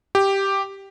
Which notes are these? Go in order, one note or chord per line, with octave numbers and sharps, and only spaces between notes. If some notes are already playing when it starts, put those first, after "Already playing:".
G4